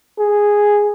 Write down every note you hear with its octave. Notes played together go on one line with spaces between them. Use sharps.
G#4